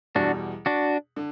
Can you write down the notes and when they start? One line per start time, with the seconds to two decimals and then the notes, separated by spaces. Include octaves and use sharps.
0.15 E2 B2 G3 D4 F#4
0.66 D4 F#4
1.16 D3